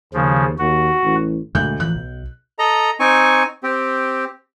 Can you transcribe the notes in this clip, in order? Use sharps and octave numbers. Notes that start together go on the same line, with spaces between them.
D#2 C#3 F3
D#2 F#4
A1
D2 A#2 G#3 A3 F#6 G6
A2 E3 F3 F#6
B1
A4 D#5 A#5
C4 D#4 G#5 C#6
C4 G4